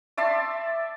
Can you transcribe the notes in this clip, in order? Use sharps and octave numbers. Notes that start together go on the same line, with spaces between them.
D5 E5 A5 C6